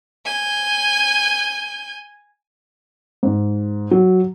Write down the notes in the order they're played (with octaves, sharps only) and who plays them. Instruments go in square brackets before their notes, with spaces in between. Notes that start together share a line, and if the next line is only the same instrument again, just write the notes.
[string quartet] G#5 G6
[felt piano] G#2
F#3